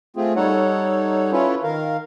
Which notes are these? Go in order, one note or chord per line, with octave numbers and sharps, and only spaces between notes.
A3 C4 F4 G#4
G3 D#4 A4 C#5 F#5
C#4 E4 F4 A4 B4 C#5
D#3 A#4 F5